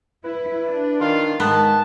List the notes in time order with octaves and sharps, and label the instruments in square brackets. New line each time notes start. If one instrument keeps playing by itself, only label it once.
[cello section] E4 [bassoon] B4
[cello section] D4
[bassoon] D#3 [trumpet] F4
[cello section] G#2 G#3 [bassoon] D#3 [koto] B3 [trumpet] A5